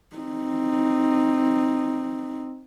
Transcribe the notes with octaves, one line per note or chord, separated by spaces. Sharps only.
C4 D#4